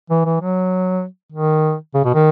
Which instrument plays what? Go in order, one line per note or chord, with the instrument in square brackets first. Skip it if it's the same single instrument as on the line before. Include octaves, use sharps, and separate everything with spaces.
[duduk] E3
E3
F#3
D#3
C#3
B2
D#3